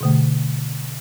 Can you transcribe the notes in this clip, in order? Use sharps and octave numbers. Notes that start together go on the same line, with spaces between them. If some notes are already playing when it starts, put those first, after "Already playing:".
B2 D3 A3